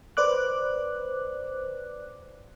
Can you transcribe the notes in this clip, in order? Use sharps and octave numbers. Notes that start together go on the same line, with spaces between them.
B4 C5 D5 D6 F#6